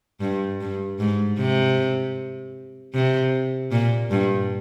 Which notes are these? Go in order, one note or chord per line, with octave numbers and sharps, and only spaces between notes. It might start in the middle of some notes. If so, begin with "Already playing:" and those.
G2
G2
G#2
C3
C3
A#2
G2